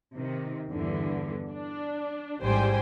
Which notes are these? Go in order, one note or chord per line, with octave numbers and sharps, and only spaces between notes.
C3 D#3
E2 G2 D3 E3
D4
A1 G#2 G3 C5 G5 G#5